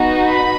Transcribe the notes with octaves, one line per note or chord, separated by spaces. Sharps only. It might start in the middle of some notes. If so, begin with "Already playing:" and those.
Already playing: B3 D#4 F#4
B5